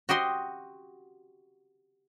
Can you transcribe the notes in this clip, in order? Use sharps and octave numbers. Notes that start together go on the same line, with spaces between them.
F#4 G4 D#5 C6